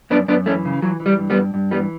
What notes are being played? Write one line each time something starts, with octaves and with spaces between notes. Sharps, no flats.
F#2 B3 D4
F#2 B3 D4
E3 A3 C#4
C#3
E3 F#3
E3
G3
G2
G3 B3
G2
G2
E3 G3 B3